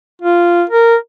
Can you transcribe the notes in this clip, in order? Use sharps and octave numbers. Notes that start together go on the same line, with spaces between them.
F4
A#4